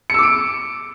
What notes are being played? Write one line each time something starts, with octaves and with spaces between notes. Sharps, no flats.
D6 E6 C#7 D7